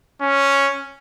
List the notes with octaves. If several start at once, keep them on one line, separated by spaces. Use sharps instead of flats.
C#4